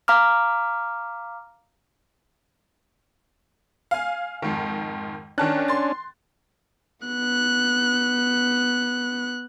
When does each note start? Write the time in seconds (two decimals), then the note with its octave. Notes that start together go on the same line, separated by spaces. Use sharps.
0.08 F5 A#5 D6 F6
3.91 F5 G#5
4.42 F2 G#2 D#3
5.38 D#3 C#4 D4 A5 F#6
5.68 C6 A6
7.06 B3 F#6